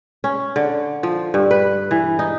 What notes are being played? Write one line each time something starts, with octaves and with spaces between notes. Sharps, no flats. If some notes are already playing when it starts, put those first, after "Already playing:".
C#4
D3
F3
G2
B4
E3
D#4